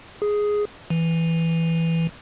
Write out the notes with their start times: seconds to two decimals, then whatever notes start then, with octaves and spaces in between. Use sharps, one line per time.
0.22 G#4
0.90 E3